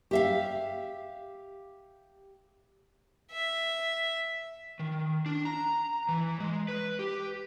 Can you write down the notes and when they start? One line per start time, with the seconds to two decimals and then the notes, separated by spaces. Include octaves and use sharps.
0.11 G4 E5 F5
3.31 E5
4.79 D#3
5.26 D4
5.45 A#5
6.08 E3
6.40 G#3
6.68 B4
6.99 G4